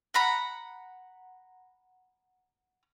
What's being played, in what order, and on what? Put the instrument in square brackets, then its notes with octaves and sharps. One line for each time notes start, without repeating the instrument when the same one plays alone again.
[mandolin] F#5 A#5 B5